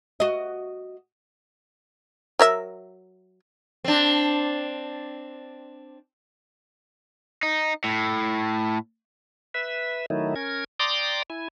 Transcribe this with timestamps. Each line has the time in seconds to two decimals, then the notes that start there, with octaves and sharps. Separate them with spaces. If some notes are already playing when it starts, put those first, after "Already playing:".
0.20 F#4 D#5
2.39 F#3 A#4 E5
3.84 C4 D4
7.43 D#4
7.84 A2
9.54 B4 E5
10.10 D#3 F#3 A3 D#4 E4
10.36 C#4 A#4 G#6
10.80 D5 G5 A#5 C6 D6 D#6
11.30 E4 G#5